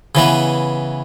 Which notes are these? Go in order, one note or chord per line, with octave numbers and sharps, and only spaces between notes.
C#3 E3 B3